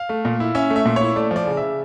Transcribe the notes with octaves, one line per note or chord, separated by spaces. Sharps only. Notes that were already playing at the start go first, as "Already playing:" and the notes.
Already playing: F5
A3
A#2
E4
C#4 E5
A3
E5
A#2
C#5
E4
A3 D5
F3 D5
C#3
C#3 E5